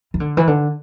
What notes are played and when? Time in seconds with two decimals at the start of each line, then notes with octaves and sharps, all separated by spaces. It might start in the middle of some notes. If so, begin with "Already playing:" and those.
0.14 E3
0.20 D3
0.37 E3
0.47 D3